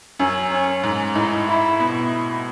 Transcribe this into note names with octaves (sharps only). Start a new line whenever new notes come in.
F#2 C#4
C#4
G#2
A2 D#4
E4
B2